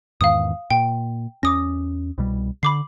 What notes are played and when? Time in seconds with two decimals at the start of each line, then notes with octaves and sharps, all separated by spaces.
0.21 E2 G#2 D#3 F5 D#6
0.70 A#2 G5
1.43 E2 C#4 D6 D#6 A#6
2.18 C2 B2 G3
2.63 D3 B5 D6 C7